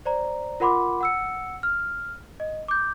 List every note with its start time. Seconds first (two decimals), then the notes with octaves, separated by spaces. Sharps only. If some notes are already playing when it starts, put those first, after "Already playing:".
0.06 C5 D5 A#5
0.60 F4 A#4 F#5 B5 C6 D6
1.01 F#5 E6 C#7
1.63 F6
2.40 D#5
2.68 D6 G6